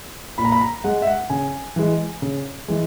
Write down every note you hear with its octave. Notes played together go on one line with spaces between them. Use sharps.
A#2 B5
A#5
B5
A#5
G#3 F#5
E5
F#5
C#3 G#5
E3 G#3
C#3
E3 G#3